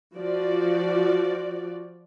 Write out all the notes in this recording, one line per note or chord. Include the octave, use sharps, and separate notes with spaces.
F3 F#4 D5